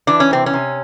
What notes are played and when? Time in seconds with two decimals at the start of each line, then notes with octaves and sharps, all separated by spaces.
0.07 E3 D4
0.20 C#4
0.31 C3 C4
0.46 C#4
0.54 C3